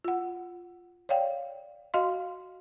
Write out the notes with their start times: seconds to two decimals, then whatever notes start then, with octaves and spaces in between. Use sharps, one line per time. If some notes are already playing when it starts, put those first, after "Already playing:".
0.05 F4 F#5
1.09 C#5 D5 F5 G5
1.94 F#4 D#5 F5 C6